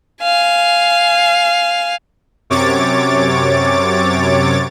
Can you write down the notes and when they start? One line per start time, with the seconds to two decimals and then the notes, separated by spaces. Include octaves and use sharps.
0.22 F5 G#5
2.50 F#2 C3 C#5 D6 A6